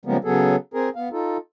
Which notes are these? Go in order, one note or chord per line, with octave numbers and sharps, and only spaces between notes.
C#3 F3 G3 G#3 A#3 B3
C#3 F#3 B3 G#4 A4
C4 G#4 A#4
B3 F5
D#4 F4 A4